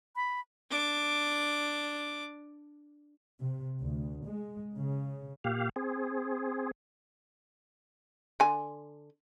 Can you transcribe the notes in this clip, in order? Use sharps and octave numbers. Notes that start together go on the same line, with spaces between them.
B5
D4 D6
C3
D2
G#3
C#3
A#2 G4 F5
C4 G#4
D3 G#5